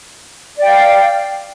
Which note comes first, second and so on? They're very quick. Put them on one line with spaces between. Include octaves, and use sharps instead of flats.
D5 G5 F5